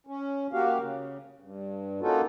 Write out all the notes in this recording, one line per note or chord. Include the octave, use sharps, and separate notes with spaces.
C#4
A#3 F#4 G4 F5
C#3
G2
A#3 C#4 D#4 F4 F#4 A4